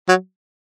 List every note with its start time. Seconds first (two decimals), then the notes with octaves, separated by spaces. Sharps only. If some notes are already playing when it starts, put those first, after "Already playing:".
0.09 F#3